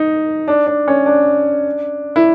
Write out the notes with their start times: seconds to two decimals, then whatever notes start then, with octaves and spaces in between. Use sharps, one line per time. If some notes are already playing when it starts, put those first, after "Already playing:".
Already playing: D#4
0.48 D4
0.67 D4
0.88 C#4
1.06 D4
2.16 E4